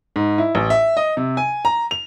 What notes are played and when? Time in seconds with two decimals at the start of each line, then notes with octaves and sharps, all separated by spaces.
0.16 G#2
0.38 E4
0.55 A1
0.70 E5
0.97 D#5
1.17 C3
1.37 G#5
1.65 A#5
1.91 F7